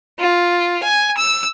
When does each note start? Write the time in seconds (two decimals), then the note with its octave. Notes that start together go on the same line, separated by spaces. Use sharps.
0.20 F4
0.83 G#5
1.18 E6